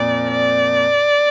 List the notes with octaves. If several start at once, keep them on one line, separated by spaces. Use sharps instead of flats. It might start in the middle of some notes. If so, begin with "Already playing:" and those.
Already playing: F2 A#2 D5
D5